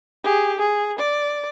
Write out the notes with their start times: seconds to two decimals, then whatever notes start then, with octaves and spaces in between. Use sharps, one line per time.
0.24 G4 G#4
0.58 G#4
0.99 D5